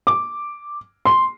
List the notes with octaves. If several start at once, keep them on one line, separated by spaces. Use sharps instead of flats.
D6
C6